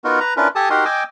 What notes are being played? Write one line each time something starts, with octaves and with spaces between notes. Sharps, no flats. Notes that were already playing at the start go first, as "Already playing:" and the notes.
B3 D#4 F4 F#4 A#4
B4 A#5
C#4 D4 E4 F4 A#4 B4
G4 A4 G#5 A5 D#6
D#4 F#4 G4 A#4 F#5 C6
D#5 G5 G#5 D6 E6